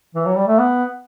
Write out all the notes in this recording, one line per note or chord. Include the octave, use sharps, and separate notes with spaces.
E3
F#3
G3
A3
B3